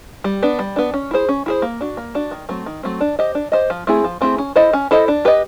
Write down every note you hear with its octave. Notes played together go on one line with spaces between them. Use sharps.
G3
B3 D4
G3
B3 D4
C#4
E4 G#4 C5
C#4
E4 G#4 C5
A#3
D4 F#4
A#3
D4 F#4
D#3
F#3 A3 C4
D#3
F#3 A3 C4
D4
G4 C5 D#5
D4
G4 C5 D#5
F3
A3 C4 E4 G#4
F3
A3 C4 E4 G#4
C#4
E4 A4 C5 D#5
C#4
E4 A4 C5 D#5
D4
G4 B4 D#5